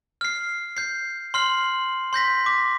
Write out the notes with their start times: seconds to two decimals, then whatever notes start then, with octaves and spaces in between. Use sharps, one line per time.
0.21 F6 C7
0.77 G6 C7
1.34 C6 F6 C7 F#7
2.13 C6 G6 A#6 B6
2.46 D6 B6